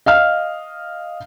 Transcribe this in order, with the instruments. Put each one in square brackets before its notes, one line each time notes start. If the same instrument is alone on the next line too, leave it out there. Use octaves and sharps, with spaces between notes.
[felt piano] D#5 F5 F6